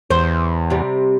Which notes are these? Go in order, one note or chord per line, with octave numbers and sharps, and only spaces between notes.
E2 C5
C3 G3